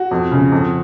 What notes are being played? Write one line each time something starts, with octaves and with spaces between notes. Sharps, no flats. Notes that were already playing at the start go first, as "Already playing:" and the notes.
Already playing: F#4
F2
C#3
F2